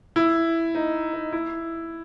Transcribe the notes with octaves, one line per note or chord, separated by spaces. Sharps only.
E4
D#4
D#4
E4